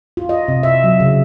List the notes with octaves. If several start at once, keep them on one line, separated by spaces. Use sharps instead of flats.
F4
D#5
C3
E5
F#3
C#3